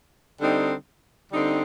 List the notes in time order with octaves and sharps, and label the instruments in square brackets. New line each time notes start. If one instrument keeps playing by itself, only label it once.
[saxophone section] D3 G3 C4 D#4
D3 G3 C4 D#4